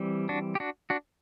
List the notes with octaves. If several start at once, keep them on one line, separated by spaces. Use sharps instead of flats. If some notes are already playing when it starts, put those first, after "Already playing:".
Already playing: E3 G3 C4
D4 F#4
G4
D4 F#4
D4 F#4